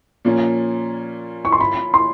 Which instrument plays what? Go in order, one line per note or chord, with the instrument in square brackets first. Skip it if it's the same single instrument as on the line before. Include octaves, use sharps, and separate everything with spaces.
[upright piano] A#2 F3 A#3 C#4
[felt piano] C#6
C6
B5
C6